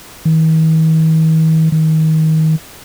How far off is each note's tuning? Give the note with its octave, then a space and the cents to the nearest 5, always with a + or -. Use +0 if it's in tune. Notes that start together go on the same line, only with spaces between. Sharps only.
D#3 +45
D#3 +25